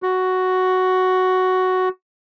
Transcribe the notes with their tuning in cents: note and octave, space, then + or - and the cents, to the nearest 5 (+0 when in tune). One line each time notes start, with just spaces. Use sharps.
F#4 +5